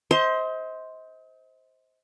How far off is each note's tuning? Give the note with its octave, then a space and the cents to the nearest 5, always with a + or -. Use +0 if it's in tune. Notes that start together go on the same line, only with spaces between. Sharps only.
C5 +0 D#5 +40